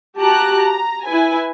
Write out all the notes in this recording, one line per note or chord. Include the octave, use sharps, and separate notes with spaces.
F#4 G4 A5 A#5 F#6
A#5
E4 B4 G#5